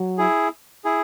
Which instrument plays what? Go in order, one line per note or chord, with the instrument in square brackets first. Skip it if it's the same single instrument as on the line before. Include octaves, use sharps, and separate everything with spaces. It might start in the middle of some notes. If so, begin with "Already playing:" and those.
Already playing: [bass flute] F#3
[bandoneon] E4 G#4
E4 G#4